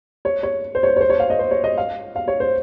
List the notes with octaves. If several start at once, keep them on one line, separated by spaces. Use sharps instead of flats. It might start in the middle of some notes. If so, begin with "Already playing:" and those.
C#5
C#5
C5
C#5
C5
C#5
C5
C#5
F5
D#5
C5
C#5
D#5
F5
F5
C#5
C5